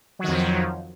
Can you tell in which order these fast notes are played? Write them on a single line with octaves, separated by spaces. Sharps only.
F#3 D#3 F2 F3